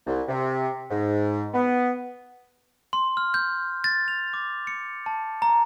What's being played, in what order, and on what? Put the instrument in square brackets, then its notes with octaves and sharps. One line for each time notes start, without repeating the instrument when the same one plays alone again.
[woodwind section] C2
C3
G#2
B3
[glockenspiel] C6
F6
G6
A6
F7
D6
C#7
A5
A#5